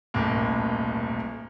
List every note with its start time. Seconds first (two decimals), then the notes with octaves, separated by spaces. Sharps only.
0.14 D#1 B1 A2 A#3